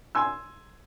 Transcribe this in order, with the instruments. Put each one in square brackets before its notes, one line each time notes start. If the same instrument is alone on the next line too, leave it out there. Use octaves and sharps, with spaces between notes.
[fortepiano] G#5 C6 E6